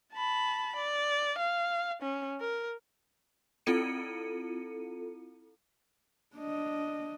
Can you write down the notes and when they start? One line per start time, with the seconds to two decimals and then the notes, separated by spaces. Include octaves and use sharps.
0.14 A5 B5
0.76 D5
1.38 F5
2.02 C#4
2.40 A#4
3.66 C4 E4 F4 A4 C#7 D#7
6.37 D4 D#5